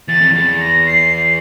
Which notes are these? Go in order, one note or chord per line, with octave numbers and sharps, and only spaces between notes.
E2 A6
F2
E2 A6
A#6
C7